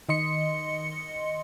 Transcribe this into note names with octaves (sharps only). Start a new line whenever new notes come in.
D#3 D#5 C6 C#7